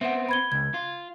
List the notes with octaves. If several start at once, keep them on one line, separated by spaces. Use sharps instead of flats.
B3 C4 E5 F#5
B5 G#6 G7
C#2 G#6
F4